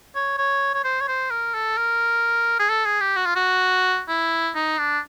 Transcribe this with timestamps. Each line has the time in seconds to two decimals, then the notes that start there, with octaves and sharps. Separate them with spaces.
0.15 C#5
0.38 C#5
0.74 C#5
0.84 C5
1.01 C#5
1.08 C5
1.30 A#4
1.54 A4
1.77 A#4
2.59 G#4
2.69 A4
2.85 G#4
3.01 G4
3.16 F#4
3.26 F4
3.35 F#4
4.08 E4
4.55 D#4
4.78 D4